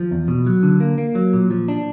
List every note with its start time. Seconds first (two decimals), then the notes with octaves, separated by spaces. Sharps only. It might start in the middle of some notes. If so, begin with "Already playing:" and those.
Already playing: F3
0.11 E2
0.28 B2
0.47 F#3
0.63 D3
0.80 A#3
0.98 A#3
1.15 F#3
1.33 A#2
1.51 F3
1.68 D4